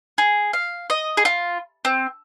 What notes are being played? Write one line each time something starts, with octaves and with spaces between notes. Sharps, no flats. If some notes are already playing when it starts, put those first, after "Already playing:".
G#4
F5
D#5
G#4
F4
C4